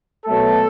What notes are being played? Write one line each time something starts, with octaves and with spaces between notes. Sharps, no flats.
B2 F#3 A3 A4